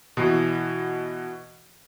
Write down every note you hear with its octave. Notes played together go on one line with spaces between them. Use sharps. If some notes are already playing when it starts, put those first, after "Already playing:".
B2 E3